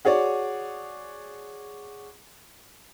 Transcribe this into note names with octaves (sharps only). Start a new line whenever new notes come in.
F#4 G#4 C#5 D5